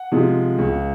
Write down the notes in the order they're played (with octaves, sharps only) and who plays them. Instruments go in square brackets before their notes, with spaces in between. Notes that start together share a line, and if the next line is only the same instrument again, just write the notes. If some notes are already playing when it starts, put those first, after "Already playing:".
Already playing: [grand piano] F#5
C3 F3 G#3
C#2